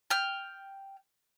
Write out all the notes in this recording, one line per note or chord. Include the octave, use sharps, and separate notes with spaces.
G5 F6